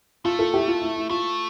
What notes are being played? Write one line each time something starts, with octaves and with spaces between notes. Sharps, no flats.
A3 F4
F4 A4
E4 G4
F4
E4
E4
A3 F4